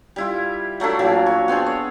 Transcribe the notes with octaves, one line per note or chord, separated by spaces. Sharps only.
G3 E4 F4
F#3 A3 D4 E4
A#2 F3 F#3
C#5
B3 C4 D4 G#4
C#5